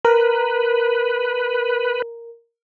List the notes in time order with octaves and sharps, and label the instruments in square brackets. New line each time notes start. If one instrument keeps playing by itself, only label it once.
[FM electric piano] A#4 [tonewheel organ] B4